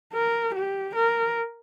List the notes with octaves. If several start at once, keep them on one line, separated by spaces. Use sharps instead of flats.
A#4
G4
A#4